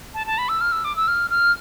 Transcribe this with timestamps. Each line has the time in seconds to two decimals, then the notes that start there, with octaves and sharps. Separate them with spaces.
0.14 A5
0.27 A5
0.38 B5
0.49 E6
0.61 F6
0.72 E6
0.85 D6
0.96 E6
1.08 F6
1.31 F6